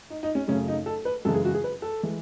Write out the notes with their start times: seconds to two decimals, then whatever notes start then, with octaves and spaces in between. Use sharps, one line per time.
0.10 D#4
0.23 D#4
0.35 C#4
0.48 F#2 C#3 F#3 A3 C#4
0.68 D#4
0.86 A4
1.05 B4
1.25 F#2 C#3 E3 G#3 A4
1.34 G#4
1.45 F#4
1.55 G#4
1.64 B4
1.82 A4
2.03 E3 G#3